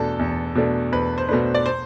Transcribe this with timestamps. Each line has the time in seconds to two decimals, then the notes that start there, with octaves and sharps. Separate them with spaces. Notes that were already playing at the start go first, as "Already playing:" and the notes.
Already playing: E2 B2 A3 D4 A4
0.19 E2
0.55 B2 A3 D4
0.92 E2 B4
1.18 C5
1.29 B2 A3 D4 B4
1.54 D5
1.66 C5